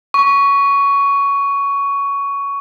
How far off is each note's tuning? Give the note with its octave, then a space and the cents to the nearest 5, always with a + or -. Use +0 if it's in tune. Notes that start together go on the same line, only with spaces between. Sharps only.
C#6 +15